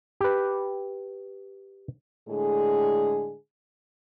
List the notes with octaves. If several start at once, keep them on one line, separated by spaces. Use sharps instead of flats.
G4 B4
A2 D3 G#3 G#4